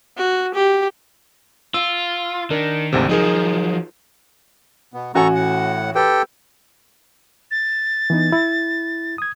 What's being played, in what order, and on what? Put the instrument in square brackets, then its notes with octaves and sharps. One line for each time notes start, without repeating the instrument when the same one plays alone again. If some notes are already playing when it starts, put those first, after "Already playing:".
[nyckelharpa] F#4
G4
[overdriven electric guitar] F4 [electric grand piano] E6
[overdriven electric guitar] D#3 [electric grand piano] D4 A#4
[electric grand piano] G#1 D2 C3
[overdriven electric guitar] F3 F#3 [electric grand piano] D#4 G#4 A#4
[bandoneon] B2 B3
[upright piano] A1 F#4 G#5 [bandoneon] A4 A#5 C#6
[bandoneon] A2 F#5
[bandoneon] G4 A4 G5 [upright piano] B4
[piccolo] A6
[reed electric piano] E3 B3 D#4
E4
D#6 G#6